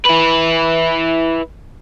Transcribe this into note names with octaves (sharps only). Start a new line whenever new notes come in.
E4 B4